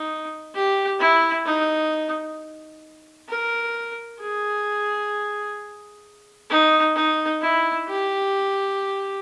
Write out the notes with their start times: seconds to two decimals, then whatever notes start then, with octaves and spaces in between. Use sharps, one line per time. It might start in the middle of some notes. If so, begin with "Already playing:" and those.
Already playing: D#4
0.55 G4
1.00 E4
1.46 D#4
3.29 A#4
4.21 G#4
6.50 D#4
6.96 D#4
7.42 E4
7.88 G4